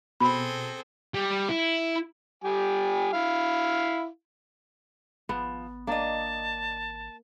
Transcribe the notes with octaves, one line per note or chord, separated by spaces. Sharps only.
B2 C4 G#4 A4 B5
G3
E4
G3 G4 G#5
E4 F5
G#1 F3 B3
A#3 D4 D#5 A5